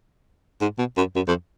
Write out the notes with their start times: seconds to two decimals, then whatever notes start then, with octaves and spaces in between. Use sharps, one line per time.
0.61 G#2
0.79 B2
0.97 F#2
1.15 F#2
1.28 F2